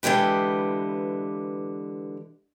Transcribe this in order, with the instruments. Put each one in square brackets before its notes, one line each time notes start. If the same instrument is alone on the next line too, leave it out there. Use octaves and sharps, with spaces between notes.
[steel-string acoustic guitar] D3 E3 G#3 G4 B4